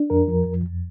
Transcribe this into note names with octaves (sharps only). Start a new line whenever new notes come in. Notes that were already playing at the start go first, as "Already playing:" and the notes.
Already playing: D4
F2 A#4
F3
F2
F2